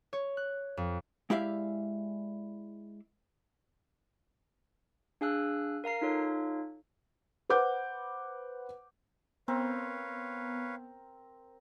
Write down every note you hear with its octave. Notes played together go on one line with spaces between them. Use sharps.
C#5
F#6
F2
G#3 E4 G4 D5 E5 F5
D4 G#4 F5 G#5 E6 F#6
A#4 F5 A#5 C7
D#4 F4 A4 C#5 F5
B4 C5 F#5 D6 G6
B3 C4 A#4 B4 C#5 F5